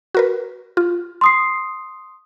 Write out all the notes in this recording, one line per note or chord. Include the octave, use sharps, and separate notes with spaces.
F#4 A#4 B4
F4
C6 D#6 C7